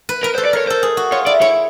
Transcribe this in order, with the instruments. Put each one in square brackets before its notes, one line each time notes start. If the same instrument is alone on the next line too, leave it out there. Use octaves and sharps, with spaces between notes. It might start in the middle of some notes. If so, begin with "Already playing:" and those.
[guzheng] B4
[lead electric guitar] A#4 [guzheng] B4
[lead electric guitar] C5
[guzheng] A4
[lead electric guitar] D5
[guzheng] A#4 [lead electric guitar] C#5
[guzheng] A4 [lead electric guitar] C5
[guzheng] G#4
F#4
[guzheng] F4 [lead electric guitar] C#5
[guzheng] E4 [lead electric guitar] D5
[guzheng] E4 [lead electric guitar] C#5